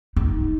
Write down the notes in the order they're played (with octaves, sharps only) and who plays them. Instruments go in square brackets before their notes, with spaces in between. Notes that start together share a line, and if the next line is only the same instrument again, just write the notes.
[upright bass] D#4